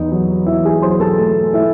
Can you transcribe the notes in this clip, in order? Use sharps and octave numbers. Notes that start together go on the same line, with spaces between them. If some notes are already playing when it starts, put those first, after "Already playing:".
Already playing: E2 D#4 D#5
F#3
E2 E4 E5
G#4 G#5
F#3 C5 C6
A4 A5
A3
A3 E4 E5